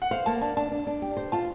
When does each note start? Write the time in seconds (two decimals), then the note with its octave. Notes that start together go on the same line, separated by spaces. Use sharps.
0.02 F#5
0.11 C5 F5
0.26 A#3 A5
0.41 D4 A5
0.57 D4 A5
0.72 D4
0.87 D4
1.02 G4
1.17 C5
1.32 F4 A5